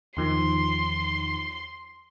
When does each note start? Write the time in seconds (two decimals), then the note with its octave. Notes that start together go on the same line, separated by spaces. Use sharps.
0.17 E2 D#3 F3 C6